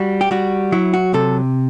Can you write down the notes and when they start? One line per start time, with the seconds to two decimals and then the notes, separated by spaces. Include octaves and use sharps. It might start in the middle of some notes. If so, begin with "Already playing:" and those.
Already playing: G3 F#4
0.21 G4
0.31 G3 F#4
0.72 F#3 E4
0.94 F#4
1.14 C3 A4